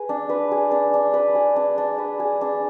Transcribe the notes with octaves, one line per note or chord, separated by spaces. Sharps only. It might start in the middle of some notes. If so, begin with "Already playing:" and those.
Already playing: G#4 B4
D4
B4
G#4
D4
D4
B4
G#4
D4
D4
B4
G#4
D4